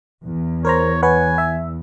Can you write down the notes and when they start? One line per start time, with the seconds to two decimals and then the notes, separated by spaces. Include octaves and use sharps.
0.22 E2
0.65 A#4 C5 C#5 A#5
1.03 B4 C#5 F#5 G#5
1.38 E5